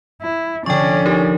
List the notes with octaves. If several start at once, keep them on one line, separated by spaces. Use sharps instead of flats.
E4
D3 F3 C#4 D5 G5 C#6
D#4 G4 A#4